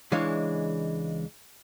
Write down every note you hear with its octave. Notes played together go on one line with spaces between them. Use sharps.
C#2 E3 G#3 D4 C#5 F5